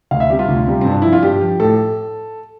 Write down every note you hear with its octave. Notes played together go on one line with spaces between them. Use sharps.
D2 F5
E5
C3 G3 G4
F4
D2
C3 G3
G2 C4
D4
F3 E4
F4
G2 G4
F3
A2 A4